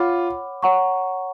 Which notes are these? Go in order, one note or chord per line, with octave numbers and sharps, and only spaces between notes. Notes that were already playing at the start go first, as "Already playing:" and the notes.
Already playing: F4 C#5 F#5 B5 D6
C#5 F#5 A#5 C#6